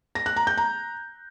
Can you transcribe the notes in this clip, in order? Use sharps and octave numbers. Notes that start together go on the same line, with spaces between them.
A#6
F#6
A#5
G6
A#5